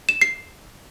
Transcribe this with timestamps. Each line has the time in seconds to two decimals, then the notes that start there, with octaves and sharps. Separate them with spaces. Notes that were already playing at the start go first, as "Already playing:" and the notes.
0.09 E7
0.21 C7